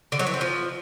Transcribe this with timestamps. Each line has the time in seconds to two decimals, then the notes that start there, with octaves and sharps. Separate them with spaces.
0.12 D3
0.19 F#3
0.27 E3
0.34 C4
0.41 F3